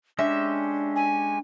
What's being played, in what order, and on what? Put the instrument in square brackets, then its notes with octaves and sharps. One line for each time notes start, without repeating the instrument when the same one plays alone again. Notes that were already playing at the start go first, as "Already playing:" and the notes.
[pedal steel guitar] G#3 C#4 G4 [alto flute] D4 [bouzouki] E5
[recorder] G#5